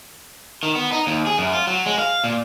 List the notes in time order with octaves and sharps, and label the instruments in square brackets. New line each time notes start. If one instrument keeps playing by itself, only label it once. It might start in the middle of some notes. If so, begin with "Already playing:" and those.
[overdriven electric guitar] D#3
B3
D#4
D#2
G#4
F#2
F4
F#3
G#3
F5
A#2